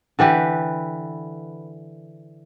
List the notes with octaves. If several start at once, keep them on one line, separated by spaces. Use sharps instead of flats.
D3 E3 G4 B4